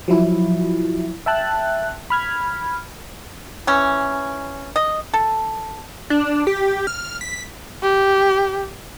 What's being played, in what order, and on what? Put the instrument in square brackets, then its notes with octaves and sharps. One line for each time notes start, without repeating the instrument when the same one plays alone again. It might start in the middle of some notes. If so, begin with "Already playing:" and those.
[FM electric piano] F3 F#3 E4
E5 G5 A5 F#6
B5 F6 G#6
[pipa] E3 C#4
D#5
A4
[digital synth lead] D4
G4
F6
B6
[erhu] G4